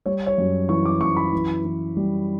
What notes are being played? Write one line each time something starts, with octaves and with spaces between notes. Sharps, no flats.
G3 C#5
C#5
F#2
E3 C#6
D6
F#2 C#6
B5
E3
E3
G3